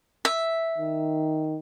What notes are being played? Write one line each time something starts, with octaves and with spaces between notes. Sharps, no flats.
E5
D#3